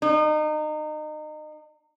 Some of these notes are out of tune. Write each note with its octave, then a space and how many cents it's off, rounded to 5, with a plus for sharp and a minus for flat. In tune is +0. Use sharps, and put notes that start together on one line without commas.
D#4 -30